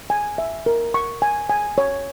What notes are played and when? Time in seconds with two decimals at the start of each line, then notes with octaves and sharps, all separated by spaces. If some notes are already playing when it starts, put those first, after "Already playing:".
0.10 G#5
0.38 E5
0.66 A#4
0.94 C#6
1.22 G#5
1.49 G#5
1.78 C#5